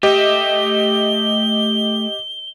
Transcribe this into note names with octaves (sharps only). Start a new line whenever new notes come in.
A3 G4 D#5 E5 G7